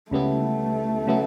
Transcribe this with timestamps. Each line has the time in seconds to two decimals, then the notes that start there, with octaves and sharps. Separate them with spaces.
0.11 C#2 C#3 G3 A3 B3 E4
1.07 C#3 F#3 B3 E4